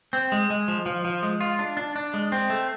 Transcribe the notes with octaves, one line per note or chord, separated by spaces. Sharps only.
C4
G#3
G#3
F3
F3
F3
G#3
F4
D4
D4
D4
G#3
C4
A3